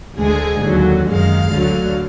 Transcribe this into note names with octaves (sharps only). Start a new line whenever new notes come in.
D2 D3 G#3 G#4
D#2 D3 F#3
F#2 D#3 G#3 F5
D2 D3 F#3